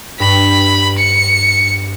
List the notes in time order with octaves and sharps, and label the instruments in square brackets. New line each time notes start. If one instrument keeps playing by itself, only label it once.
[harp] G2 [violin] B5
[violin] C#7